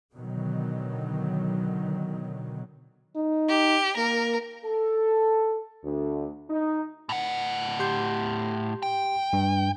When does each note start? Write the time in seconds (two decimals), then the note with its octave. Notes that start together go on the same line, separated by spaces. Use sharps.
0.14 B2 D3 D#3 F#3
3.16 D#4
3.49 G4
3.97 A#3 A#4
4.65 A4
5.84 D2
6.49 D#4
7.09 A2 F#5
7.80 G4 C6 G6
8.83 G5
9.33 G2